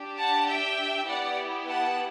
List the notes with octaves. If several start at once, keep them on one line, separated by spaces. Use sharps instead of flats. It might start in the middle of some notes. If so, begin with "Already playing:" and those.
Already playing: D4 G4
F#5 A5
E5 G5
B3 E4 G4 D5 F#5
F#5 A5